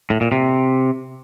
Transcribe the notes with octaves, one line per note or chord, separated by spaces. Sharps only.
A2
A#2
C3